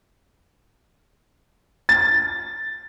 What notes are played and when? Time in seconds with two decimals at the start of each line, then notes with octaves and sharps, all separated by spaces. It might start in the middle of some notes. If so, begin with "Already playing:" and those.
1.89 A6